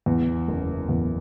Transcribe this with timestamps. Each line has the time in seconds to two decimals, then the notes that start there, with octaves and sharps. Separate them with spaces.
0.06 E2
0.48 F#1
0.89 E2